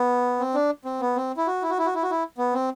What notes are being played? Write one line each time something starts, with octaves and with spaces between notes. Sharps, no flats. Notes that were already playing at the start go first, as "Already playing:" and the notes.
Already playing: B3
C4
D4
C4
B3
C4
E4
F#4
E4
F#4
E4
F#4
E4
F#4
E4
B3
C4